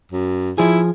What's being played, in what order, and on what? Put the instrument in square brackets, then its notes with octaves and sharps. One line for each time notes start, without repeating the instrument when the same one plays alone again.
[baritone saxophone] F#2
[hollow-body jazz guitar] F3 G#4 [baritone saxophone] E4